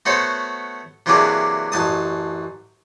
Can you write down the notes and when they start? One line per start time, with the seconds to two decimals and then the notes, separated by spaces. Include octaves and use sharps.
0.06 A3 B3 F#4 A4 C5 C#5
1.06 C3 E3 F#3 A#3 D4 G#4
1.72 A1 F#2 A5 D#6